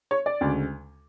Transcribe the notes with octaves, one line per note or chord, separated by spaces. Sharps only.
C#5
D5
D2 C#3 G#3